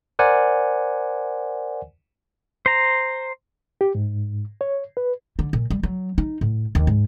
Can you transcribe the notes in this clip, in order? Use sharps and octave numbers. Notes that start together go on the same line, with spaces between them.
A#4 C5 D5 F#5 G#5
C5 A#5
G4
G#2
C#5
B4
D3
A#2
G3
F#3
D#4
A2
D#2
G#2